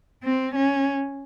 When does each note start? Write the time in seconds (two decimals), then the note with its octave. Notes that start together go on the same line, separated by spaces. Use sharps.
0.24 C4
0.55 C#4